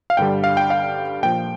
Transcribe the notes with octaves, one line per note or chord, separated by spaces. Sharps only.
F5
G2 D3 G3 G5
F5
G5
F5
A#2 F3 G5